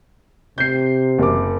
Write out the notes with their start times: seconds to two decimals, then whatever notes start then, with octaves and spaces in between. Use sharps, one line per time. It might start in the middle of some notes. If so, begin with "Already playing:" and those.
0.58 C3 G6 C7
1.19 F#1 D6